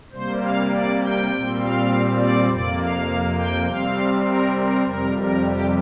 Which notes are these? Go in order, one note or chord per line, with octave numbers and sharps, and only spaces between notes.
C3 G3 A#3 C5
F5
D5
G5
A#2 G3 C4
F5
D5
F2 C3 A#3 D5
F5
G5
C3 G3 C4 F5
A#4
A#4
F2 C3 G3 A#4
A#4
G4